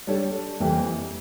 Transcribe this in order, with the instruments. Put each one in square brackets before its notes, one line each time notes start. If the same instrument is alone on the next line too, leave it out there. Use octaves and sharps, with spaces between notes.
[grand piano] G3 D4 A4 C#5
F2 E3 G3 A#3